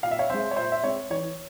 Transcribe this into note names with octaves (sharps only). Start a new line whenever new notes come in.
A#2 F5
E5
C#5 F5
G#3 C4 C5 E5
C#5
A#2 C5 E5
E5
G#3 C4 C#5
E3 C#5